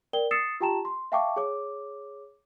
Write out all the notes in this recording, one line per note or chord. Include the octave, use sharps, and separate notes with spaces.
A#4 D5 G5 G7
D#6 E6 A6 C7 C#7 E7
F4 G4 G5 A5 A#5 E7
C6
E5 F5 G5 A5 C#6 D6
G#4 C#5 D6